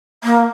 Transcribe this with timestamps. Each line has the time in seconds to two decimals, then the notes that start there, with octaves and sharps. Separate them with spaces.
0.24 A#3